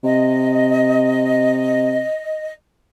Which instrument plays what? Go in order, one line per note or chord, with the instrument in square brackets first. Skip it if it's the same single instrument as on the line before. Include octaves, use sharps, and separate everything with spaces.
[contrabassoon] C3 [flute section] D#5